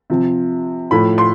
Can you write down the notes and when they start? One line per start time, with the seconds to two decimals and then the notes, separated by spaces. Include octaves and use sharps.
0.10 C3 F3
0.91 A2 F3 B5
1.18 C6